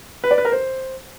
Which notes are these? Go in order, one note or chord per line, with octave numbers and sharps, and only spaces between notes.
B4
D5
B4
A#4
C5